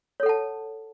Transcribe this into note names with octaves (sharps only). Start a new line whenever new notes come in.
A4 C#5 F#5 A5